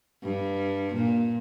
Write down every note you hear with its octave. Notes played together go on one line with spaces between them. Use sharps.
G2
A#2